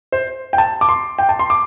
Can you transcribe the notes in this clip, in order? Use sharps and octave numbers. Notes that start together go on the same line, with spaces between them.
C5
G5
A5
D6
C6
G5
A5
C6
D6